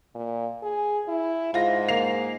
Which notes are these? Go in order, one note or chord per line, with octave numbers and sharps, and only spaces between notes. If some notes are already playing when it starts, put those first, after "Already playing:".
A#2
G#4
E4
G#2 F4 A#6
A#3 C7 F7